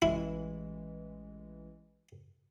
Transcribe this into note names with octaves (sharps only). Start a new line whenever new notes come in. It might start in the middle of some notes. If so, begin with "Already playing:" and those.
A1 E3 G#3 E4